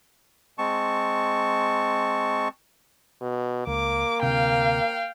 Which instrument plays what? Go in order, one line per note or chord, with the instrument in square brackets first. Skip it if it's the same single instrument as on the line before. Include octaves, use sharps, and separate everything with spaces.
[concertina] G#3 C4 A5 C#6
[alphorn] B2
[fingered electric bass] C#2 [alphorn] A#3 [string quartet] D6
[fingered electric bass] D2 C3 [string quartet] F5 G5